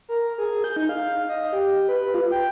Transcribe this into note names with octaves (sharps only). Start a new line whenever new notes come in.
A#4
G#4
G6
D#4
F5
D#5
G4
B4
F4
G5